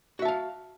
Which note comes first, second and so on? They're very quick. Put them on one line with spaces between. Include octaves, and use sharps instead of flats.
F#4 E5 A5 F5